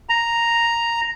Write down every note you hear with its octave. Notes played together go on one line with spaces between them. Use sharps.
A#5